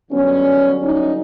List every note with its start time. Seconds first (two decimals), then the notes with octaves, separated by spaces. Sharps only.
0.11 G2 D3 F#3 B3 C#4
0.82 C#4 D#4